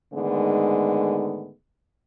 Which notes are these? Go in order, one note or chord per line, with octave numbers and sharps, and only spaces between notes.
G#2 D3 D#3 G#3 A3 B3